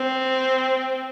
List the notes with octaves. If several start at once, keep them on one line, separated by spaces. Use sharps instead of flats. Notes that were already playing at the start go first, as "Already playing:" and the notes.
Already playing: C4